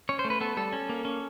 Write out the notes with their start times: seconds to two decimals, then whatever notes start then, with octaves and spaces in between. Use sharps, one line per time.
0.09 C#4 C#5
0.19 C5
0.25 A3
0.30 B4
0.41 B3 A4
0.57 G3 A4
0.72 C#4
0.89 A#3
1.05 C#4